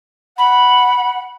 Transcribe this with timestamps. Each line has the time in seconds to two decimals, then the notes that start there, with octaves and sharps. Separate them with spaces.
0.38 F#5 B5